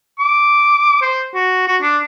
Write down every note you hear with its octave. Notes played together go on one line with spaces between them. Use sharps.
D6
C5
F#4
F#4
D4